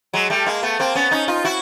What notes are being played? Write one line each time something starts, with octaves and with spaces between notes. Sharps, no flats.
F#3 G#3
G3 A3
G#3 A#3
A3 B3
A#3 C4
B3 C#4
C#4 D#4
D#4 F4
E4 F#4